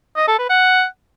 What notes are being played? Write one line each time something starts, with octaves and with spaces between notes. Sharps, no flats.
D#5
A4
B4
F#5